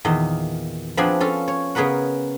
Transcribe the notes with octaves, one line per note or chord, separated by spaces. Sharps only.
E2 A#2 D#3 D#5
F3 B3 C4 D4 G#4 B4
C#4 F4 A4
C#5
C#3 B3 G#4 A#4 B4 F#5